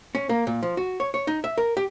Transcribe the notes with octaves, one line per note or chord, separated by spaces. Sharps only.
C#4
A#3
A#2
F3
F#4
C#5
C#5
D#4
E5
A#4
G4